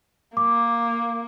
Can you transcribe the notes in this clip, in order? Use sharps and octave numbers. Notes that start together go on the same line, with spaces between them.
A#3 D6